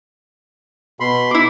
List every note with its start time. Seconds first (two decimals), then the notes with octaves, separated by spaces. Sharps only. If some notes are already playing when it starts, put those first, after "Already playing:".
1.00 B2 B5 C6
1.31 E4 D6